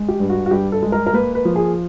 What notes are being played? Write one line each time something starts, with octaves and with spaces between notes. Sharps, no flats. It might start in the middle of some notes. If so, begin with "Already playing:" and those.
Already playing: G#3
G4
G2
F#4
F#4
G2 G4
A4
G#3
A#4
A#4
A#3 B4
B4
F3
G#4